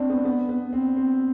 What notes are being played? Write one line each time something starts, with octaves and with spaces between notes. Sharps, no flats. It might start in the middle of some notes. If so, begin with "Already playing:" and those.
Already playing: C4 D4
B3
B3
B3
C4
C4